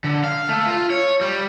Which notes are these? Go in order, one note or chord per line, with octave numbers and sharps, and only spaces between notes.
D3
F5
A3
F4
C#5
G3